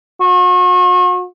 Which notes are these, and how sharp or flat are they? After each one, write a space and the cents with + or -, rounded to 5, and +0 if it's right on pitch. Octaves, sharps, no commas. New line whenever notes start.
F#4 -40